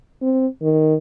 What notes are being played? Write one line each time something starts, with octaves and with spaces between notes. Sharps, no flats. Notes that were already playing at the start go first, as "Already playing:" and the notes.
C4
D#3